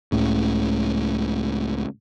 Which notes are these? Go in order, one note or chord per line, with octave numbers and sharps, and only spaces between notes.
C#2 A2 C#3